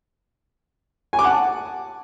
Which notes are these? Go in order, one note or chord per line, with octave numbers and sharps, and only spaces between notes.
G#5
D6
F#5
A5